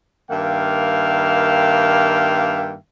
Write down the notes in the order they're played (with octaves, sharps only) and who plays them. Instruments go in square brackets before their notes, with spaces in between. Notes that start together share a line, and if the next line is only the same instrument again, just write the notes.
[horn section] G2 D#3 A#3 E5 F5 G5